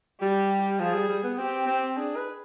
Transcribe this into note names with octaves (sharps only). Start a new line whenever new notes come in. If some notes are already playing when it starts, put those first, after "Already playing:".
G3 G4
F3 G#4
G3
G3
B3
C4 G4
C4
D4 G#4
B4